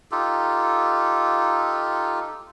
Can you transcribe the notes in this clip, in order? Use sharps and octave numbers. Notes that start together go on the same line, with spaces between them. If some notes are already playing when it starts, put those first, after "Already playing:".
D#4 F4 G4 A4